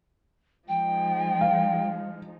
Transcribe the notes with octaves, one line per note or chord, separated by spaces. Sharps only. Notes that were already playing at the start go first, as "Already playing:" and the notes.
F3 G#3 D#4 G5
F5